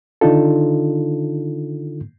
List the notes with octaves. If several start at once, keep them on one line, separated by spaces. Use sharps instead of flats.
D3 D#3 D4 D#4 F4 A4